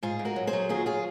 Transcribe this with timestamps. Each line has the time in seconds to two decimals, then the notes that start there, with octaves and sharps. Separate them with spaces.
0.03 G#2 F4 G#4
0.19 G#2
0.25 F#4 A#4
0.36 F#3
0.47 G#4 C5
0.53 F#3
0.69 D#2 F4 G#4
0.86 F4 G#4